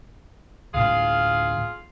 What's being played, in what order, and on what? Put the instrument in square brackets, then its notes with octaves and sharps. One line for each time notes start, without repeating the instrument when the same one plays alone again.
[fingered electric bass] D2 A2 A#3 [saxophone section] F4 G#4 F5